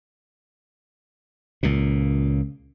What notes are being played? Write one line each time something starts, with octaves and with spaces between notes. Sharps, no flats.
C#2 A#2